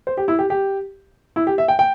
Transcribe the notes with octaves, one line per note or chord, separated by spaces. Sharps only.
C5
G4
E4
G4
G4
E4
G4
E5
G5
G5